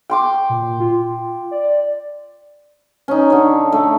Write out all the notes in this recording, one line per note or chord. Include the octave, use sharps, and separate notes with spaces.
G5 C6 D6
A#2
F4
D5
C#4 D#4
D3 C#5
A3